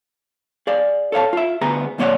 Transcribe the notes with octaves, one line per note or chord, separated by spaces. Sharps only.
G#4 D5 F5
A4 C#5 F5 A5
F4 E5
D2 B3 G#4 A#5
F#2 B2 A#3 C#5 D5 F#5